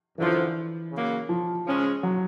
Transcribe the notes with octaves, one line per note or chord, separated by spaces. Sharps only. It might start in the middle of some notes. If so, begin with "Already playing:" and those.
F#2 D3 E3 F3
C#3 F#3 A#3
F3
C#3 F3 G#3 C#4
F#3